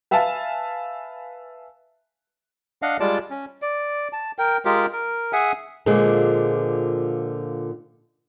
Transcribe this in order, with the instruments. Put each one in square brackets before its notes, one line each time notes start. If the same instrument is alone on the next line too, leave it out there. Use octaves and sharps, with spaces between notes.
[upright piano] B4 E5 F5 G#5 A5
[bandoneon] D4 D#5 F5 F#5
G3 G#3 F4 D5 A5 D6
C#4
[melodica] D5
A5
A#4 G5
G#3 F4 G4 A#4
A#4
G#4 E5 F#5 G#5
[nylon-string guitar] A#2 D3 F3 G#3 G#4